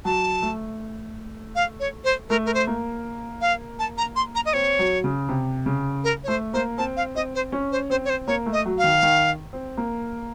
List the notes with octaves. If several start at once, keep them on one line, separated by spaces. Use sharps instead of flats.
F#3 A5
A3
F5
C#5
C5
A3 A#4
A#4
C5
A#3
F5
A5
A#5
C6
A#5
D#5
C4 C#5
F#3
C#3
C3
C#3
A#4
C#5
A3 C5
A#3 C5
C4 A5
F5
C4 D#5
C5
C#4
C5
C4 C5
C#5
C5
A#3 C#5
A3
D#5
F#3
F5
D#3
D#3
C4
A#3